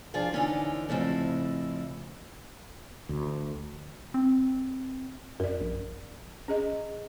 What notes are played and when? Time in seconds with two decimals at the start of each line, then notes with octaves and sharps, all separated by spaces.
0.14 F3 D4 F4 G#4 F5
0.33 D3 E3 C#4 D#4
0.89 F2 A2 C#3 E4
3.09 D2
4.14 C4
5.40 F#2 A#4 D5
5.61 A#1
6.48 C#4 G#4 D#5